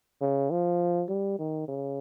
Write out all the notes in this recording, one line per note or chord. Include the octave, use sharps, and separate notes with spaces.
C#3
F3
G3
D#3
C#3